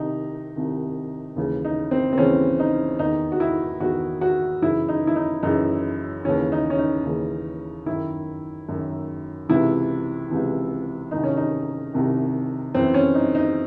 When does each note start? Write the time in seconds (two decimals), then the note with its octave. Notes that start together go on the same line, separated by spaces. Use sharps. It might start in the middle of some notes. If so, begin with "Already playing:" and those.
Already playing: C2 C3 D#3 D#4
0.56 C2 C3 D#3
1.36 D#2 C#3 E3
1.65 D#4
1.91 C4
2.13 C4
2.18 D#2 C#3 E3 C#4
2.59 D#4
2.99 E2 D#3 D#4
3.32 F#4
3.40 E4
3.80 E2 D#3 F#4
4.21 F#4
4.62 F#2 C#3 E3 E4
4.89 D#4
5.07 E4
5.16 D#4
5.43 F#2 C#3 E3 D#4
6.24 D#2 C#3 E3 C#4
6.52 D#4
6.70 C#4
6.78 D#4
7.05 D#2 C#3 E3
7.86 F#2 D#3 E4
8.69 F#2 D#3
9.49 C#2 C3 E3 E4
10.30 C#2 C3 E3
11.11 C2 C3 D#3 D#4
11.23 C#4
11.37 D#4
11.93 C2 C3 D#3
12.74 F#2 E3 C4
12.94 C#4
13.15 D#4
13.35 D#4